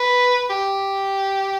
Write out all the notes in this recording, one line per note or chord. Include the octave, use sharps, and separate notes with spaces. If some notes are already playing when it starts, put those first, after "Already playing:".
Already playing: B4
G4